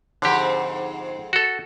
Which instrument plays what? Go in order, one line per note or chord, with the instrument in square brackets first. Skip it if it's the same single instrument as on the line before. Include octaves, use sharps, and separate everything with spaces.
[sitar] F2 G#2 C4 [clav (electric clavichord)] D3 G4
[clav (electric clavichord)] F#4 A4